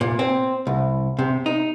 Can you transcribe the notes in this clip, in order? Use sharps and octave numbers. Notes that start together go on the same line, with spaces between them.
A#2
C4
C2
C3
D#4